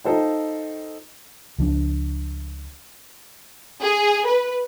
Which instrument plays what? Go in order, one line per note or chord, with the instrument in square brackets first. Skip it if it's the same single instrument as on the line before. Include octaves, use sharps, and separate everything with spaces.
[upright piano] D#4 F4 A4 C5 G5
[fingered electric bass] C#2 F3 D4
[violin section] G#4
B4